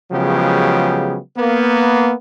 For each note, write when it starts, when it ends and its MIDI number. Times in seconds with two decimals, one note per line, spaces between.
0.12 1.17 49
0.12 1.17 53
0.12 1.17 54
0.12 1.17 56
0.12 1.17 59
0.12 1.17 67
1.37 2.12 58
1.37 2.12 59